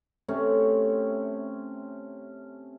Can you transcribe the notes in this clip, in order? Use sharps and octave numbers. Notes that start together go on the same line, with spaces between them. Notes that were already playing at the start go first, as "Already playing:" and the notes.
C3 A3 C4 C#4